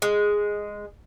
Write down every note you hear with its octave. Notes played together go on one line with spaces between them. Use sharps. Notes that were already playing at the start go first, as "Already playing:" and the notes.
G#3